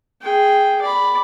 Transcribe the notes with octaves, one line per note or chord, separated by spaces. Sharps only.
G#4 G5
D5 B5